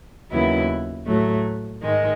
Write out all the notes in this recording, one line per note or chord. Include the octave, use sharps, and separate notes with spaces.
D#2 C#3 F#3 B3 E4
A2 F#3 A3
G#2 D#3 G#3